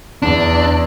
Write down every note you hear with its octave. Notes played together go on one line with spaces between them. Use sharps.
E2 D4